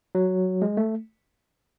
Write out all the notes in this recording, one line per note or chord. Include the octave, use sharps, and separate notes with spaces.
F#3
G#3
A3